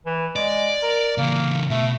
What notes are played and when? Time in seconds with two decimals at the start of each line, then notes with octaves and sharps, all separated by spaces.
0.06 E3
0.36 G#3 D5
0.83 A#4
1.18 C#3 E3 A#3
1.70 B2 A3